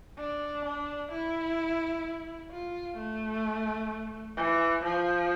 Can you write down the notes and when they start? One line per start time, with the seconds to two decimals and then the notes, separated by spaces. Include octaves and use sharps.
0.19 D4
0.65 D4
1.12 E4
2.51 F4
2.98 A3
4.37 E3
4.84 F3